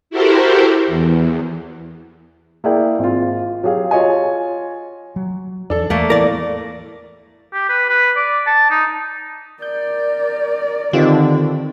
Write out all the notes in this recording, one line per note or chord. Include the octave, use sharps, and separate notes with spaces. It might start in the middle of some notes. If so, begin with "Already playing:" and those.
E4 F#4 G4 A4 A#4 C5
E2
A#3 E4 G#4 D5 G5
G#1 F4
F#3 G4 G#4 F5
F4 C#5 D#5 G#5
F#3
E2 D4 A4
E2 A3 A#3
A2 E3 B3 A#4 D5
G4
B4
B4
D5
A5
D#4
A#4 D5 G6
D3 D#3 C4 F4 G4